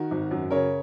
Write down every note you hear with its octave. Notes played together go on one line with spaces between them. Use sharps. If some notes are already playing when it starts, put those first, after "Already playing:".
Already playing: D#3 F#4 A#4
G#1
F#2
C#3 A#4 C#5